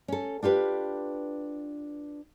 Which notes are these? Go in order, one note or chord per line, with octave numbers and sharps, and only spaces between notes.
C#4 A4
D4 F4 G4 B4